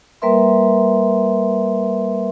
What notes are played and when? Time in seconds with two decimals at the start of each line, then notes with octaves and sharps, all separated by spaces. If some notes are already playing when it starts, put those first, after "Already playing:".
0.22 G3 A#3 A#4 B4 E5 C6